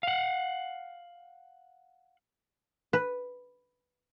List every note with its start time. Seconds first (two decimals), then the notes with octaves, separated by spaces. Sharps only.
0.03 F5 F#5
2.93 B4